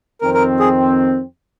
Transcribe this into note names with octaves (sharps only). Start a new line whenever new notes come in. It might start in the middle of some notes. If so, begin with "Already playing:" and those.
F2 D#3 C4 A#4
A#4
G#4